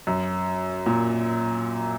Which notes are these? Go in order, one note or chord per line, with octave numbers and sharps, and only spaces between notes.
F#2
A#2